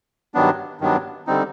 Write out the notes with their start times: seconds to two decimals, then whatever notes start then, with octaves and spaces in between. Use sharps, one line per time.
0.34 G2 D#3 F#3 B3 D4
0.81 G2 D#3 F#3 B3 D4
1.27 D3 G3 C4 D#4